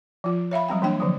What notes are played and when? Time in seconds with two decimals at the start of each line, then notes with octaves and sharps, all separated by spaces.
0.24 F3 F4
0.51 C#5 E5 F5 B5
0.68 F#3 G3 C4 G5
0.82 E3 A#3 D4 G5
1.00 D3 F3 F#3